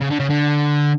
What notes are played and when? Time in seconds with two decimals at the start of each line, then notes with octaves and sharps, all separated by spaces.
0.01 C#3
0.10 D3
0.19 C#3
0.30 D3